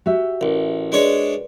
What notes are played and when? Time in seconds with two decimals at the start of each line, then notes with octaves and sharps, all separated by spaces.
0.06 F#4 G4 E5
0.41 A1 A#4
0.92 G#3 D4 B4 C#5 D5